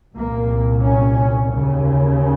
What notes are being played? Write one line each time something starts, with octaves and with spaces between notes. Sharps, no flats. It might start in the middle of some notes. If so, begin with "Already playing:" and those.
C2 A#2 A#3
C#4
D#2 C#3